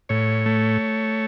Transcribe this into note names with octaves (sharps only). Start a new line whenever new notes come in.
A2 C#5
A3